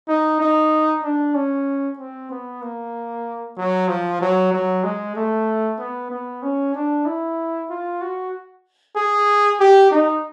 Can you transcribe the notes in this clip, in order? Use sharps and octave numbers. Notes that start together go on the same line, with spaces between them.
D#4
D#4
D4
C#4
C4
B3
A#3
F#3
F3
F#3
F#3
G#3
A3
B3
B3
C#4
D4
E4
F4
F#4
G#4
G4
D#4